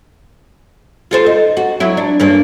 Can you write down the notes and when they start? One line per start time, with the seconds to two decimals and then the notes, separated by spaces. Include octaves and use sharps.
1.11 F4 A4 C5
1.26 D#4
1.57 F#4
1.80 F#3 E4
1.97 D4
2.20 G2 A#3 C#4